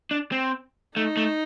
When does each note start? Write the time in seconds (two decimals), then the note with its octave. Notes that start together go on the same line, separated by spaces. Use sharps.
0.11 D4
0.32 C4
0.96 A3 D#4
1.17 A3